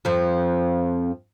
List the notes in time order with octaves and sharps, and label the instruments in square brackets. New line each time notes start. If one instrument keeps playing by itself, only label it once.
[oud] F2 F3